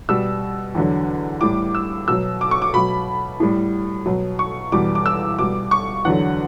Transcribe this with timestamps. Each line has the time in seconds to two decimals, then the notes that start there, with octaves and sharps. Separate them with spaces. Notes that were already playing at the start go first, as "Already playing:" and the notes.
0.09 B2 G3 E6
0.75 E2 D3 F#3
1.41 A2 G3 D6
1.75 E6
2.08 B2 F#3 E6
2.41 D6
2.51 C#6
2.62 D6
2.74 B2 F#3 B5
3.40 A2 G3
4.06 B2 F#3
4.39 C#6
4.72 E2 B2 G3 D6
4.95 D6
5.06 E6
5.39 B2 G3 D6
5.71 C#6
6.05 E2 D3 F#3 F#5